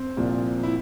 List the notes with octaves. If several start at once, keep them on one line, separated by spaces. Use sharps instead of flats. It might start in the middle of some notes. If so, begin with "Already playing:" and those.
Already playing: C4
C2 A#2 F3
E4